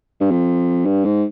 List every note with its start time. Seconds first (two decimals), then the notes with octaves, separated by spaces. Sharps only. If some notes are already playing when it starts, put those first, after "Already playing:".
0.21 G2
0.31 F2
0.86 G2
1.05 G#2